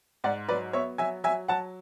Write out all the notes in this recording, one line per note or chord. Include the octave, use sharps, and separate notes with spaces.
G#2 D5 F#5
F#3 B4 D5
B3 C#5 E5
F#3 E5 G#5
F#3 E5 G#5
F#3 F#5 A5